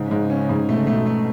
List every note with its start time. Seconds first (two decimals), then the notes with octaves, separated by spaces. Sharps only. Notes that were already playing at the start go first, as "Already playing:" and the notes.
Already playing: G#2 C#3
0.11 G#2
0.30 C#4
0.49 G#2
0.68 B2 A3
0.79 C#3
0.87 B2 A3
1.06 A3